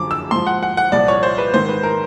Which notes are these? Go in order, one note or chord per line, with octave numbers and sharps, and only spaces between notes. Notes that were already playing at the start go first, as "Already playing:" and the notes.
Already playing: F#2 D3 F3 D6
E6
G#2 F3 C6
F#5
F#5
F#5
C2 A#2 F3 D5
C#5
C5
B4
G#2 D#3 C5
B4
A#4